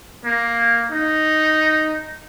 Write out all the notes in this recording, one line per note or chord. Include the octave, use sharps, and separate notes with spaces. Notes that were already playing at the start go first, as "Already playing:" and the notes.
A#3
D#4